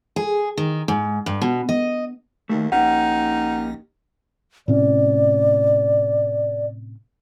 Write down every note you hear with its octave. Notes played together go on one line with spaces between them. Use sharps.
G#4
D#3
G#2
G2
B2
D#5
D#2 D#3 A3
A#1 A#3 C#4 D#4 G4 F#5
A2 C3 C#4 D5